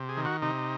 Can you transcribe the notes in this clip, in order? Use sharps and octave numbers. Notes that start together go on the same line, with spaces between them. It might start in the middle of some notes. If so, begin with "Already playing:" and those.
Already playing: C3
G#4
D#3
F#4
C3 D#4